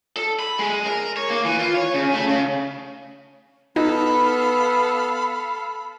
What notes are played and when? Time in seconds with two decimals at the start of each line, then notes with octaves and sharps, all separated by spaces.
0.16 A4
0.39 B5
0.59 G#3
0.85 A#4
1.17 C#5
1.30 A#3
1.44 E3
1.59 F4
1.75 C#5
1.94 C#3
2.13 A3
2.28 C#3
3.76 B3 D#4 A4 F5 B5